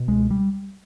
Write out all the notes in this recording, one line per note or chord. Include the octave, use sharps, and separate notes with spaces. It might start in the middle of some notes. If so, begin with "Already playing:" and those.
Already playing: B2
C#2 G#3
G3